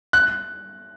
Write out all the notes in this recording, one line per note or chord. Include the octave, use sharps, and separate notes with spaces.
F#6